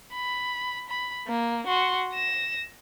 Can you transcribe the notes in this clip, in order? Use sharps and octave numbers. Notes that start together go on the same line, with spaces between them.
B5
B5
A#3
F#4 C6
A#6 E7